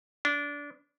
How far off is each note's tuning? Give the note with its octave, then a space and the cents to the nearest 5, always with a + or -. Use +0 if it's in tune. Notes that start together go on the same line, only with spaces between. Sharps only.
D4 -20